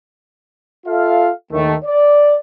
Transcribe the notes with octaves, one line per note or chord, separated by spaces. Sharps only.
F4 A4 E5 F5
D#2 D#3 A3
D5